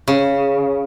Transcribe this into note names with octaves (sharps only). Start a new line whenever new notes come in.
C#3